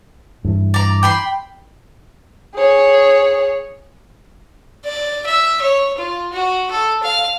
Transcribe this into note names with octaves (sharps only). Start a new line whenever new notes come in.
G2 E3
D5 A#5
G5 B5 C6
G#4 C#5
D5
E5
C#5
F4
F#4
A4
F5